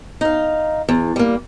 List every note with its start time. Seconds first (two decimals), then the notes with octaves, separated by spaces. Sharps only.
0.21 D#4 F5
0.89 E2
1.16 G3 A#3